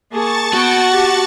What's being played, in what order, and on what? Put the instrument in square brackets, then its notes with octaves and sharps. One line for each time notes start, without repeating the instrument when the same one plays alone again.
[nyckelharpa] A#3 G#4 [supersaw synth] A5 C#6 A6
[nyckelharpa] B3 G5 [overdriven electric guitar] F#4
[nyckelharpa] G4